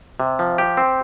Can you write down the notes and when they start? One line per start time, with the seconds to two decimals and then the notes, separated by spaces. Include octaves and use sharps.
0.20 C3
0.39 F3
0.58 G4
0.77 C4